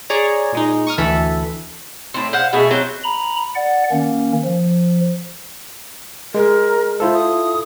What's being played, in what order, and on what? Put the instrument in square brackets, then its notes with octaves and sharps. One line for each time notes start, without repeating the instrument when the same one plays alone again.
[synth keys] G#4 C#5 D5 A#5
A#2 G#3 D#4
C#6 D#6 F6
D2 E3 A4 B5
[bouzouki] A2 C4
C5 F5 F#5
B2 A3 G#4
F#3 C4 F#4 G5
[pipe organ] A#5 B5
D5 F#5
D#3 A#3 C#4
F3
[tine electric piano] G#3 [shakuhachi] A#4
[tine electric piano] E4 F4 A4 [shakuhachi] C5
[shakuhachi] D#6